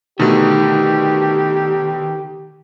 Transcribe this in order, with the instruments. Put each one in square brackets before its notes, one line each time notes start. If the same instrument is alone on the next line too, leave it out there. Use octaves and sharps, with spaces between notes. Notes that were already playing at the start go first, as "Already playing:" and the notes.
[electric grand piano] B2 D3 A3 [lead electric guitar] D#3 [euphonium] G4